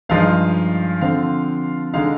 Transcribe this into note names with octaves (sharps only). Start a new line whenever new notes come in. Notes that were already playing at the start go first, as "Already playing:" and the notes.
G2 F3 G#3 D#4 F5
D3 F3 C4 F5
D3 G#3 D#4 F5